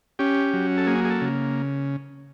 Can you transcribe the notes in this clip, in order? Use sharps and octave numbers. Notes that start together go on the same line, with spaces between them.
C#4 G4
F#3
A4
A#3 G#4
G#4
A4
C#3